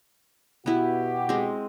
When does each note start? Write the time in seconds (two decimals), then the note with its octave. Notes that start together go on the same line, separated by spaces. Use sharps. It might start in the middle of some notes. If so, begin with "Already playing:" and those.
0.66 B2 B3 E4 F#4 G4
1.29 G#3 C4